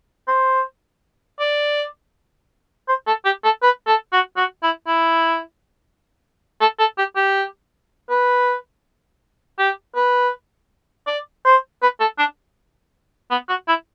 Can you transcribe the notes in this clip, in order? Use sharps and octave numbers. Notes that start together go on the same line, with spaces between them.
C5
D5
C5
A4
G4
A4
B4
A4
F#4
F#4
E4
E4
A4
A4
G4
G4
B4
G4
B4
D5
C5
B4
A4
D4
B3
F#4
E4